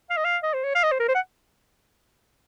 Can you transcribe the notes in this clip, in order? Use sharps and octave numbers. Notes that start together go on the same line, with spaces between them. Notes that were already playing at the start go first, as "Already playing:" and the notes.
F5
D#5
F5
D#5
C5
C#5
F5
D#5
C5
A#4
C5
F#5